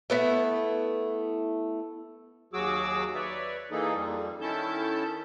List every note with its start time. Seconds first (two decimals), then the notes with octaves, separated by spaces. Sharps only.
0.10 A3 B3 E4
2.53 D#2 F#3 F#4 G#4 D6 E6
3.15 B4 C#5 D5 E5
3.71 E3 A#3 D#4 G#4 A4
3.94 F2 G3
4.41 D#3 C#4 E4 A4 A5 G6